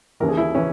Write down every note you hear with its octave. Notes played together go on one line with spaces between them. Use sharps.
D#2 C#3 E3 A#4
G#4
E4
C#3 E3 C#4